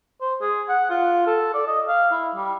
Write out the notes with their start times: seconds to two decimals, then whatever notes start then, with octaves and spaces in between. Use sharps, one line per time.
0.21 C5
0.41 G#4
0.69 F#5
0.90 F4
1.27 A4
1.54 D5
1.67 D#5
1.88 F5
2.11 E4
2.35 G3